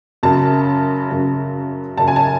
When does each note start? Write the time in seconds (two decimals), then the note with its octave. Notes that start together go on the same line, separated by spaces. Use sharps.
0.23 F#2 C#3 F#3 A5
1.10 F#2 C#3 F#3
1.98 F#2 C#3 F#3 A5
2.08 G#5
2.16 A5